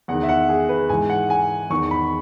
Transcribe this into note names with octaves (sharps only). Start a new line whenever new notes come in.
E2 D#3 F#5
E5
F#5
G#4
B4
G#2 E3 G#5
F#5
G#5
E2 D#3 C#6
B5